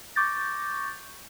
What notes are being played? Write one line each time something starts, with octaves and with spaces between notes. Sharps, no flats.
C#6 D6 G6 A6 A#6